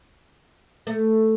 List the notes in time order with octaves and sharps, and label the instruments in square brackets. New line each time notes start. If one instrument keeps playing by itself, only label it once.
[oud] A3